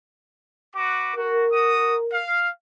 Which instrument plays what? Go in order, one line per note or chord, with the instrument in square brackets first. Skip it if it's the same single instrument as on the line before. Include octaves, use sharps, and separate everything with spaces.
[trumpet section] F#4 B4 D6
[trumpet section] F#4 [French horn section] A#4
[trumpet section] F#4 D#6
F5